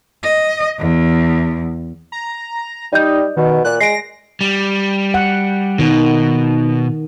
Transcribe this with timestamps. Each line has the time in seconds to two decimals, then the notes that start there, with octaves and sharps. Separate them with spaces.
0.23 D#5
0.78 E2
2.12 A#5
2.93 G3 D#4 D5 D#5 G6
3.37 B2 D#3
3.65 A#2 F#6
3.81 G#3 A#6 C7 D7
4.41 G3
5.14 F#5
5.79 B2 D#3